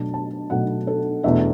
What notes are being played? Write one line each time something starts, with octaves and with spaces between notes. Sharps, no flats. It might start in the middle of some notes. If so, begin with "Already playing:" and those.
Already playing: B2 F#3 A3 D4 A5
A5
B2 F#3 A3 D4 F#5
A4
E2 B2 A3 D4 E5